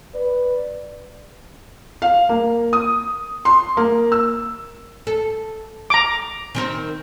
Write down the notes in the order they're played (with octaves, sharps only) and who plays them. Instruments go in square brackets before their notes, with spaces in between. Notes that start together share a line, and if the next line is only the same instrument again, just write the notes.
[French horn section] B4 D5
[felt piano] F5
A#3
D#6
C6
A#3
E6
[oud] A4
[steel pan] A#5 D6
[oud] D#3 C4 A#4